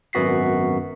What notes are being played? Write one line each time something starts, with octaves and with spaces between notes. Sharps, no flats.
G#1 F#2 B3 F#4 B6 C7